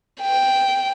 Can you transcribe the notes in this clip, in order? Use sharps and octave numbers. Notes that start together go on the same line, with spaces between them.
G5